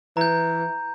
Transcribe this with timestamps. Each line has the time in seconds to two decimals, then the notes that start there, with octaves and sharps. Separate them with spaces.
0.17 E3 A#5 G6